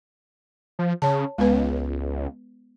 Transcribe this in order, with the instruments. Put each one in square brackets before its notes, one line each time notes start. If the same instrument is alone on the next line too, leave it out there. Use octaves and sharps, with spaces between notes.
[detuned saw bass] F3
[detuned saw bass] C#3 [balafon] C#5 A5
[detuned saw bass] C#2 [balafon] G#3 B3 B4